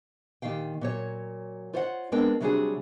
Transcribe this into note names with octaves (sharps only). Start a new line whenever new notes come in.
A#2 D#3 G4 F5 G5
A#2 F#3 C#5
F4 C5 C#5 D#5 E5 F#5
G#3 B3 C4 D4 A#4 G5
C3 F#3 G3 D4 F#4 G#4